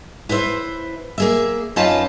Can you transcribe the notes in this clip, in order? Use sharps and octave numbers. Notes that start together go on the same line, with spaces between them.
E4 B4 C5 D#5 E5
A#3 G#4 E5
F#2 C#4 D#4 F4 B4 A5